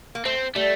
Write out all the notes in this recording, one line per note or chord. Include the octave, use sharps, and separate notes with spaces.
A#3
A3 C4
G3 A3